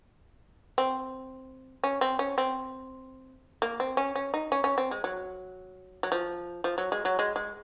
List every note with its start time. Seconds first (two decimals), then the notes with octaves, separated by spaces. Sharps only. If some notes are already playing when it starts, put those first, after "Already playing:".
0.78 C4
1.83 C#4
2.01 C4
2.19 C#4
2.38 C4
3.62 A#3
3.80 C4
3.97 C#4
4.15 C#4
4.34 D#4
4.52 C#4
4.64 C#4
4.78 C4
4.91 G#3
5.04 F#3
6.03 F#3
6.12 F3
6.64 F3
6.78 F#3
6.92 G#3
7.05 F#3
7.19 G#3
7.36 G#3